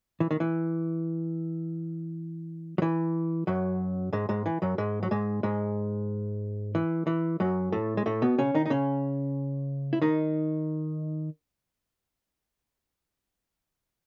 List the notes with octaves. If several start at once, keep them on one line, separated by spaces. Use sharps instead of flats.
E3
D#3
E3
F#3
E3
F#2 F#3
G#2 G#3
G#2 G#3
E3
F#2 F#3
G#2 G#3
F#3
G#2 G#3
G#2 G#3
E3
E3
F#2 F#3
A2 A3
G#3
A2 A3
B2 B3
C#3 C#4
D#3 D#4
D#4
C#3 C#4
E4
D#3 D#4